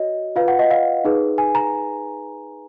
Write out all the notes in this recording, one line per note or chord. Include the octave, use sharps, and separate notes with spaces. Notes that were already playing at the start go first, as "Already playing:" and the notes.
Already playing: F#4 C#5 D#5
F4 B4 F5
F#5
D#5
F5
D#4 G#4 B4
G#5
A#5